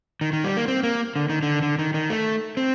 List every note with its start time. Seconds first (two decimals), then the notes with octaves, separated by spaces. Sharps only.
0.21 D#3
0.33 D#3
0.44 G3
0.57 A#3
0.68 C4
0.83 A#3
1.16 D3
1.30 D#3
1.43 D3
1.63 D3
1.79 D#3
1.94 D#3
2.10 A3
2.57 C4